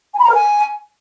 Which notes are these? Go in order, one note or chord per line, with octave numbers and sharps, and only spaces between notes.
G#5
B5
A#5
A#4
G#5